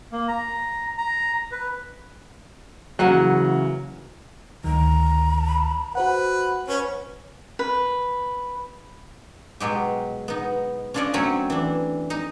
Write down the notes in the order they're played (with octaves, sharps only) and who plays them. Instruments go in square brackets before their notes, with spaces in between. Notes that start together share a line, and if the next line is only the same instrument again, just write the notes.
[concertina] A#3
A#5
A#5
B4
[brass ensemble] C#3 E3 [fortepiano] F#3 [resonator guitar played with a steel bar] A#3 F#5 G#5
[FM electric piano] D2 D#3 [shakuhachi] A#5
[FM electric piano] F#4 C5 F#5 [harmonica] B4
[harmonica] C#4 [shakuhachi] B4
[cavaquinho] B4
[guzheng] B2 F#3 G#3 G4
B3 D#4
C#4 D4 F4 A4 D5 D#5
F#3 A3 C4 C#4 G#5 B5
E3 D4
D#4